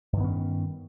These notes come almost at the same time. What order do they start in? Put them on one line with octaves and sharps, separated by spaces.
G2 D#3 B3 C#4